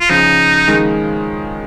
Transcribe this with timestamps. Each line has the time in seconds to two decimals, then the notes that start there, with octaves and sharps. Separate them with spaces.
0.01 F4
0.09 C#3 F3 D#4
0.68 D#3 G#3